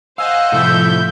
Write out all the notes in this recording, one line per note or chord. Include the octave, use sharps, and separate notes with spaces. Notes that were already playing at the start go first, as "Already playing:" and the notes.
C5 D#5 F5 F#5 G#5 E6
A2 C3 F3 E4 A4 E5 G6